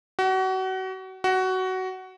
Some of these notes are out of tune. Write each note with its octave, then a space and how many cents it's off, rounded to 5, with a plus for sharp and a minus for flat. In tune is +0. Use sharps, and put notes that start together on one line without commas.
F#4 +30
F#4 +15